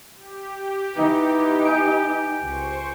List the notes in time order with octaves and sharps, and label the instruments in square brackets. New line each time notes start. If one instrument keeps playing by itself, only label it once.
[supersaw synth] G4
[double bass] E3 B3 [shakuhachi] D#4
[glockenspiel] G#5 G6 D7
[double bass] C#2 [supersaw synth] C5 C#6